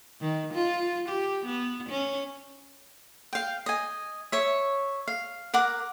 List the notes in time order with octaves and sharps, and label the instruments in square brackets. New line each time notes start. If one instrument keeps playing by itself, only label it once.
[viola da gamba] D#3
F4
G4
B3
C#4
[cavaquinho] F5 G5
D#5 G#5
C#5 E5
F5
A#4 F#5 D6